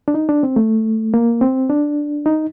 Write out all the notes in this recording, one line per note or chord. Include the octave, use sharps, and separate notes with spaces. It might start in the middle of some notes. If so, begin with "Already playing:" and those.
D4
D#4
D4
C4
A3
A#3
C4
D4
D#4